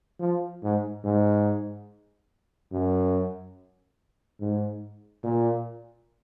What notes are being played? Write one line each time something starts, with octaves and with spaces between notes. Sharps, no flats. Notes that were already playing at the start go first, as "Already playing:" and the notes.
F3
G#2
G#2
F#2
G#2
A#2